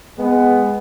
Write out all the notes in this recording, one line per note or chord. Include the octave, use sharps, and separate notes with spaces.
G#3 B3